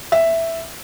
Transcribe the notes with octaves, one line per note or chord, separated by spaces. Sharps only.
E5